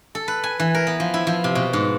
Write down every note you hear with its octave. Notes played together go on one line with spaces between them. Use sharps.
A4
B4
G#5
E3
A#4
B3
F3
E4
F3
C3
B2
G#2